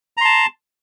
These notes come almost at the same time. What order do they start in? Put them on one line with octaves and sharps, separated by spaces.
A#5 C6 A5